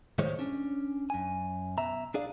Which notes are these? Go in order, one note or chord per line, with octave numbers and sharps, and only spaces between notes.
A2 D#3 G3 G#3 C5 C#5
C#4 D4
F#2 G#5
B2 E5 A#5
D4 G#4 D5 F5